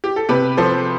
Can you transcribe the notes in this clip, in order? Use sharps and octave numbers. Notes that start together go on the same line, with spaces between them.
G4
A4
C3 G4 B4
F3 A4 C5